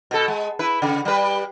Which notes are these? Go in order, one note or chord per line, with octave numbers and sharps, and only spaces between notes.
B2 A4
G#3
E4 B4
C#3
G3 B4